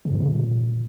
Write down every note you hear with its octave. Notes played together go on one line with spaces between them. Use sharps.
C#3
F#2
B2
D3
A#2